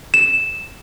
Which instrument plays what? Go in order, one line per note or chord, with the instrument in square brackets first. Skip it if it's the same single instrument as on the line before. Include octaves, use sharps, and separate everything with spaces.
[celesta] E7